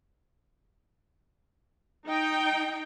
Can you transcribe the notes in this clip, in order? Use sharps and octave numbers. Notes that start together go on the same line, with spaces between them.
D#4 G5